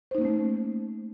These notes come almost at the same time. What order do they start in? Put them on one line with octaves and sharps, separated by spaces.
C5 D#4 A#3 C#4 A3